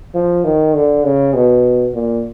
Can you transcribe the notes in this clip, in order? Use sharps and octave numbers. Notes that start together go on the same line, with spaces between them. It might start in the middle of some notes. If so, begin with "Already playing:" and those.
F3
D#3
D3
C#3
B2
A#2